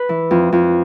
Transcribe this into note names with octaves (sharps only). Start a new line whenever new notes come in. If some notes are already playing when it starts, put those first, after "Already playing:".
Already playing: B4
E3
F2
F2